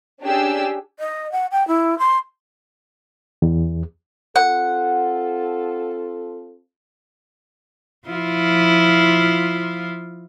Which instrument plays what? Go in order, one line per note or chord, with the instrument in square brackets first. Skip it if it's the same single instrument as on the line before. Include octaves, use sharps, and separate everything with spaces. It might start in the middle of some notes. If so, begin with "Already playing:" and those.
[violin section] C#4 D4 G4 G#4 E6
[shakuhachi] D#5
F#5
G5
E4
C6
[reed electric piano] E2
[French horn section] C4 F4 A4 [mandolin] F#5
[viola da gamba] F3 E4 F4